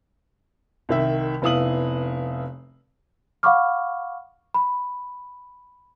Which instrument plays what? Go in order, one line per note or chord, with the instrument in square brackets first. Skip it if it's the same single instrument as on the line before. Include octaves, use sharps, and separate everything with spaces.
[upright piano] C2 D#3 E5
F1 B3 E4 F5 D#6 F#7
[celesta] F5 F#5 B5 C#6 D6 F6
B5